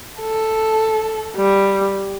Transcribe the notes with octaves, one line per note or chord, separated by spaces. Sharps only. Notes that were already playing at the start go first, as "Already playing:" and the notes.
A4
G3